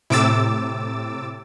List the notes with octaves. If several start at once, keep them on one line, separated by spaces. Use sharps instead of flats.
A2 C3 D6 E6 A6